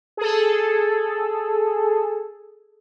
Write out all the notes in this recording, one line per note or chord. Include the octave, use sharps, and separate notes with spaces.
G#4 A4